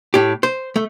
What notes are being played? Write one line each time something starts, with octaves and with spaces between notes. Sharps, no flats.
A2 G4
C5
A3